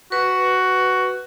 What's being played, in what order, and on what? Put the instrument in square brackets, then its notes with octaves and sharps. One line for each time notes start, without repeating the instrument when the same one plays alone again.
[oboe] F#4 [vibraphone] B4